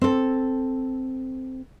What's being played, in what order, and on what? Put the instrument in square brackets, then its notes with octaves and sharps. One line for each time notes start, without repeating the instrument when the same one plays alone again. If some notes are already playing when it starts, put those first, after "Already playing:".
[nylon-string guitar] C4 A4